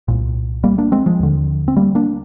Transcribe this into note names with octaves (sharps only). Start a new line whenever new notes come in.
C2 A#2
G3 A#3
A#3 D4
G#3 C4
F3 G#3
D#2 D3
C4
G3 A#3
A#3 D4